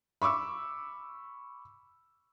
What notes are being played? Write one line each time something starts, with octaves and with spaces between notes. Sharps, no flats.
B5 C#6 D6 E6